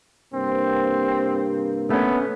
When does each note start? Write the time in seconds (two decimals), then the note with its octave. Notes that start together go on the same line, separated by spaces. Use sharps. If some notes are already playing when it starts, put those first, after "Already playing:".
0.34 G2 C3 A#3 C4
1.90 A3 B3 C#4